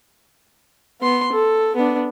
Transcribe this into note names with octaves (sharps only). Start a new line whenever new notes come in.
B3 C6
A4
B3 D4